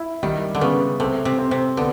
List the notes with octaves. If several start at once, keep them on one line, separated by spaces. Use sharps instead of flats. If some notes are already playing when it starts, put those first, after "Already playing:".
Already playing: E4
D#3 G3
D3
C#3 B3
C3 A3
C3
C4
C3
D3 B3